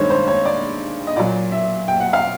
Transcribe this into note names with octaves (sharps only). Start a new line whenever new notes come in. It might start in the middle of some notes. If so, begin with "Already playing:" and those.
Already playing: G2 D#3 G#3 C5 C#5
C5
C#5
D5
D#5
A#2 F#3 D5
E5
G5
F#5
F5